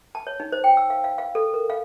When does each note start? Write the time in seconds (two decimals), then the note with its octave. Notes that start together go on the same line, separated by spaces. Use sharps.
0.15 A5
0.27 C#5
0.40 D#4
0.52 C5
0.64 G5
0.77 E6
0.90 F5
1.04 F5
1.18 F5
1.35 A4
1.54 A#4
1.70 F5